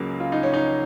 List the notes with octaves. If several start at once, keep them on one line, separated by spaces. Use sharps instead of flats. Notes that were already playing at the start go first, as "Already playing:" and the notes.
Already playing: C#2 C#3 F#3 A#3
F4
D#4
C#4
D#4